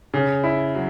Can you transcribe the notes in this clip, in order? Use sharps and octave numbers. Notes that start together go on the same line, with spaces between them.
C#3
E4
F#3